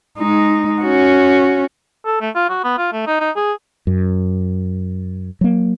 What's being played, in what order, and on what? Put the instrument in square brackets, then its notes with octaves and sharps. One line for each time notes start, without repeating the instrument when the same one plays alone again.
[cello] G#3 D#4
C#4 F#4
[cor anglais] A4
A3
F4
F#4
B3
F4
A3
D#4
D#4
G#4
[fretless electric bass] F#2
F#3 A#3